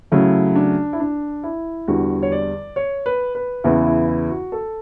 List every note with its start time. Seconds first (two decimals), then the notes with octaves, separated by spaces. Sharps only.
0.12 C#3 F#3 A3 E4
0.56 D4
0.93 E4
1.00 D4
1.44 E4
1.88 E2 D3 G3 F#4
2.23 C#5
2.32 D5
2.76 C#5
3.06 B4
3.35 B4
3.64 E2 C#3 E3 B3 E4
3.87 E4
4.08 E4
4.30 F#4
4.52 A4